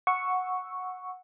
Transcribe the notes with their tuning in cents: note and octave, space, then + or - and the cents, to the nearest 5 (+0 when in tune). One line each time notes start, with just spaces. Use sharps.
F#5 -10 C#6 +0 E6 +0